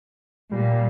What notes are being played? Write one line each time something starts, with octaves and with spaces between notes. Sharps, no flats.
A#2 G3